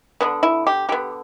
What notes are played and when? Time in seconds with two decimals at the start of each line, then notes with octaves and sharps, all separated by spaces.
0.21 D3 B3 D4
0.43 E4
0.67 G4
0.89 D3 B3 G4